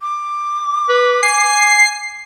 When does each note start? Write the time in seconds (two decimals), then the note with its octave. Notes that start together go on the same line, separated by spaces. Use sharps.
0.01 D6
0.89 B4
1.23 G#5 C7